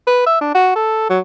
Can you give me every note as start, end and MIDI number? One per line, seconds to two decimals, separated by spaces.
0.07 0.26 71
0.26 0.39 76
0.41 0.50 62
0.54 0.71 66
0.76 1.08 69
1.10 1.20 54